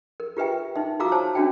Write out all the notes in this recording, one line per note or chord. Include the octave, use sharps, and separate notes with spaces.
A#4
F4 G4 B4 E5 G5
D#4 E5
F4 F#4 F5 A#5 D6 E6
C5 C#5 A5
C#4 D4 F#4 E5 G5